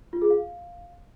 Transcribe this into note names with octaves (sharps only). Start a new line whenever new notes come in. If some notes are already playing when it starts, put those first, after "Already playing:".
F4
G#4
F5